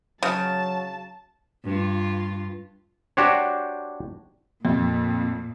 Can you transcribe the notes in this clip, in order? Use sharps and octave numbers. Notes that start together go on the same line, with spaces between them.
C#3 F#3 A5
G2 F4
D4 F#4 G4 C5 C#5
F2 A#2